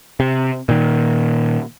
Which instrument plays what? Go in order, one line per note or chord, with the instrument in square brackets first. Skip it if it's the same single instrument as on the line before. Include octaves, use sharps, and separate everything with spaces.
[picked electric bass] C3
A#2 D#3